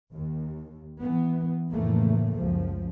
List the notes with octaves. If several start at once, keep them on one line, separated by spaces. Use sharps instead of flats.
D#2
E3 B3
F1 A2 C#3 E3 A3 A#3
C#2 F#2 F3